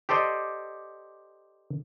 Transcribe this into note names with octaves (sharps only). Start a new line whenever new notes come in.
G4 A4 C5 D5 D#5